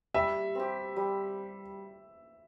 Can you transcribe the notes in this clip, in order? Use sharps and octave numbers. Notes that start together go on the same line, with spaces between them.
G3 E5
C4 G4
G3